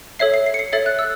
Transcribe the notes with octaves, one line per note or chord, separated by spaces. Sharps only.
A4 C#5 E5 C7
C7
C7
C#7
C7
A4 C#5 E5 A6
F#6
E6